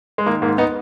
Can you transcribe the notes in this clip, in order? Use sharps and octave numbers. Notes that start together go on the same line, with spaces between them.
G#3
D#3 A#3
G#2 A#3
B3 D#4